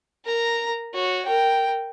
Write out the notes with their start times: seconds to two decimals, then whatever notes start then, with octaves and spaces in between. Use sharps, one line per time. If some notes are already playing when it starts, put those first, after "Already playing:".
0.25 A#4 A#5
0.93 F#4 C#5
1.26 A#4 G5